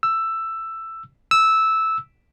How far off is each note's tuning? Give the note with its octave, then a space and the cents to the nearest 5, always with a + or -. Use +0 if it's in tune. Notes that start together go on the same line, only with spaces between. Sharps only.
E6 +10
E6 -10